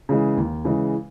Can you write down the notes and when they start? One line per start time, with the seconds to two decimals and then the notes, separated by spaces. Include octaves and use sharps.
0.09 C#3 E3 G#3
0.37 D#2
0.65 C#3 E3 G#3